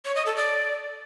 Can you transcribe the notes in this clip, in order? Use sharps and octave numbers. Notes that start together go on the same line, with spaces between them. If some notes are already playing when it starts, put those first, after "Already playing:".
C#5
D#5
A4
D5